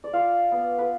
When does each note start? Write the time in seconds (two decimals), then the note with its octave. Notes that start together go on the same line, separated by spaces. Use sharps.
0.04 D5
0.13 F4 F5
0.51 B3
0.78 B4